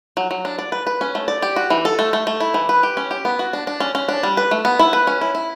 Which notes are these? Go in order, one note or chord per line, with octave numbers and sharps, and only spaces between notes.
F#3
F#3
D4
D5
B4
B4
C#4
A3
D5
G4
F#4
E3
A4
A3
A3
A3
E4
E3
B4
G4
C#4
G4
B3
F#4
D4
D4
C#4
C#4
D4
G3
B4
A3
B3
E4
B4
C#4
E4
E4